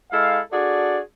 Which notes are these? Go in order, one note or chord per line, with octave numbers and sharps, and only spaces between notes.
G#3 E4 A4 F5
D4 F#4 G#4 A4 D5